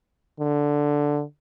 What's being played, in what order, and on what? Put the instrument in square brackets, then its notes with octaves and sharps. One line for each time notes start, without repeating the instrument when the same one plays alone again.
[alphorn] D3